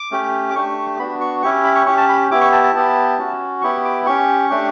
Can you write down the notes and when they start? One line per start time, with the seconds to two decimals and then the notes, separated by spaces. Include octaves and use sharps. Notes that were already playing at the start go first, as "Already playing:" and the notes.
Already playing: D6
0.11 A3 C#4 G4
0.50 D6
0.54 A3 D4 G4 C#6
0.99 B3 D4 F#4 B5
1.21 C#6
1.42 C#4 E4 G4 C#6
1.64 B5
1.75 C#6
1.86 C#4 G4 C#6
1.97 A5
2.09 B5
2.31 B3 E4 G4 D6
2.41 C#6
2.53 A5
2.63 A5
2.75 B3 E4 G4
3.18 C#4 F#4
3.62 B3 E4 G4 C#6
3.85 D6
4.06 C#4 G4 C#6
4.50 A3 D4 G4